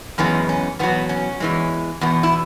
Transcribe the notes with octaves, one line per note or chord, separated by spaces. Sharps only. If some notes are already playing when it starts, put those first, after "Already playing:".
F#2 C#3 E3 G#3 B3 C#4
C#4
E2 B2 F#3 B3
C#4
E2 E3 G#3
E2 B2 B3
E4